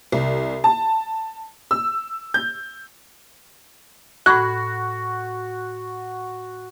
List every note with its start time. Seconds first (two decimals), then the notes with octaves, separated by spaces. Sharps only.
0.12 C2
0.64 A5
1.71 E6
2.34 G6
4.26 A2 F#4 B5 F#6 G#6